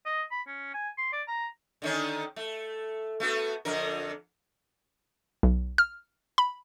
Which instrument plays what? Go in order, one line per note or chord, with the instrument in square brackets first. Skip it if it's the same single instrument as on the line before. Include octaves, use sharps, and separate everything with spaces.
[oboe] D#5
B5
C#4
G#5
C6
D5
A#5
[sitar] D3 D#3 C#4
A3
A3 B3 F#4
F2 D3 A#4
[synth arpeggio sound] B1
F6
B5